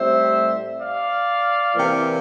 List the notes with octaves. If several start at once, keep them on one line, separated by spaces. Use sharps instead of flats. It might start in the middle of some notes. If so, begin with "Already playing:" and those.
Already playing: A2 G3 C4 C5 E5
D5 F5
C3 E3 A#3